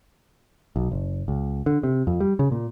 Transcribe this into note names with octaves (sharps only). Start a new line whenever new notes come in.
B1
F#1
C#2
D3
C3
F2
G3
C#3
A#2